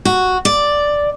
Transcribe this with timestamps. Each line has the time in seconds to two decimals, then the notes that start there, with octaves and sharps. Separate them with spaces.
0.05 F#4
0.45 D5